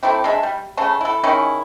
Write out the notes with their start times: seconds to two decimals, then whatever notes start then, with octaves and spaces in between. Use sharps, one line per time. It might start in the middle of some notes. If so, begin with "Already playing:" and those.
0.03 A3 C4 E4 G4
0.24 G#3 D4 E5
0.43 G3
0.77 C#3 A3 A5
1.01 E4 A4
1.23 D#3 G#3 C#4 E4